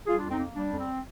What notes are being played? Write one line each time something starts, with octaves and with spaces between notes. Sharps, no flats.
G3 F4 G#4
F2 D4 F4
C4 D#4
A#3
G3 D4
F2
C4